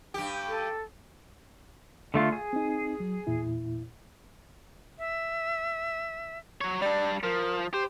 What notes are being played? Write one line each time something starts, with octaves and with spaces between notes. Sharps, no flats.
G2 G4
A4
D3 A3 F4
G#4
C4 D#4
F#3
E2 A#2 E4
E5
F#3 C#5
G3 D4 D5
F3 A#4
G4 C5